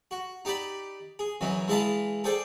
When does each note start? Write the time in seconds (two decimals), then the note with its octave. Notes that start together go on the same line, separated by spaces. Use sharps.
0.11 F#4
0.45 D#4 G4 D5 B5
1.19 G#4
1.41 F#2 E3 F#3 D#4
1.68 E3 G#3 E4 D#5 F5 A5
2.24 G#4 A4 C5 D5 G5